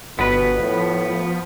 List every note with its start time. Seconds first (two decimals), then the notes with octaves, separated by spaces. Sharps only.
0.19 G1 B2 B3 B4
0.60 A2 F3